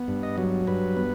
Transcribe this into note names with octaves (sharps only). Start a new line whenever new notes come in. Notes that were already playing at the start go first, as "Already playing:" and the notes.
Already playing: B3
G2
D#5
F#3
G2 B4
B3